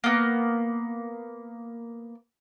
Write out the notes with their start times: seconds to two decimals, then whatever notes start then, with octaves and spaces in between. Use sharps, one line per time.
0.04 A#3 B3